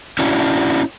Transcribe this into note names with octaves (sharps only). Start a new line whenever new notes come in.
C#4 D4 E4 F#4